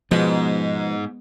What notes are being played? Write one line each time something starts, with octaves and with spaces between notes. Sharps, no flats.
G#2 B2 F3 G#3 B3